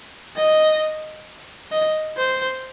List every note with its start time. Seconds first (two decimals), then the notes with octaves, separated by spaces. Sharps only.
0.37 D#5
1.72 D#5
2.18 C5